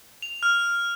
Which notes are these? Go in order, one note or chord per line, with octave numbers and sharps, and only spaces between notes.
F7
F6